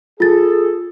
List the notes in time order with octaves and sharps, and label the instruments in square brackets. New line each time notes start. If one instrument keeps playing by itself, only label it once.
[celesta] F4 A6 [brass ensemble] G#4 A4